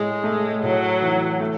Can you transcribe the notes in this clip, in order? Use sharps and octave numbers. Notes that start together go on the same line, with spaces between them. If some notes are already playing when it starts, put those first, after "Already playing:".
Already playing: A2 G#3
A3
A2 F#3
E3
A3